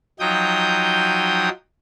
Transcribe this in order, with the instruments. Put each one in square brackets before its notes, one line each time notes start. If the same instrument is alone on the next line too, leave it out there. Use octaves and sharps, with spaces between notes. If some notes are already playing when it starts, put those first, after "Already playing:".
[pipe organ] F3 F#3 D#4 G5 D#6 G6